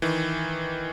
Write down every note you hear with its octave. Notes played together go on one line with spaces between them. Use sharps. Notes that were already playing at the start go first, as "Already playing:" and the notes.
D#3 E3